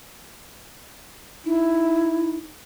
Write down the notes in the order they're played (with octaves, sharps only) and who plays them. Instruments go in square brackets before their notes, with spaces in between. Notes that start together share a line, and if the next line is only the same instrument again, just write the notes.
[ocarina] D#4 [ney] E4